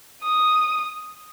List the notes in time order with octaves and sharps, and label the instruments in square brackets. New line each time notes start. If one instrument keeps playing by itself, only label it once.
[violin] D#6